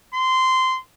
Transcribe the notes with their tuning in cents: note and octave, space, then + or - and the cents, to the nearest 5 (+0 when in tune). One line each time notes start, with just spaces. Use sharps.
C6 -15